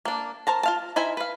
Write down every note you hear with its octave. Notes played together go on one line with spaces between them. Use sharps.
A#3 D4
A#4 C5 A5 A#5
F4 F5 A5
D#4 E4 C5 E5 G#5
B4 F5